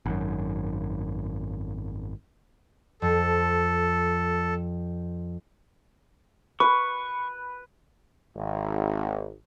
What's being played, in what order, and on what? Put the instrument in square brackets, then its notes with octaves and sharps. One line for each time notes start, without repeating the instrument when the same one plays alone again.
[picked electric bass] G#1 F#2
[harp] F2 [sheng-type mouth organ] A4
[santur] B4 [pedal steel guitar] C#6
[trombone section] G#1